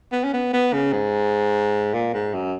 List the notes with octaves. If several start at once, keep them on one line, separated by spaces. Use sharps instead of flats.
B3
C#4
B3
B3
C#3
G#2
A#2
G#2
F#2